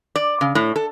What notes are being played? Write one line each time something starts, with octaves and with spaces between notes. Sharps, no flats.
D5
C#3
A2
A4